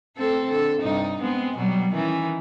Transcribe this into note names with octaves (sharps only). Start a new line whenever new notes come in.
A3 C4 A4
D3 A4
G2 C3 D#4
G#3 B3 C4
B2 F#3 G3
D#3 E3 C#4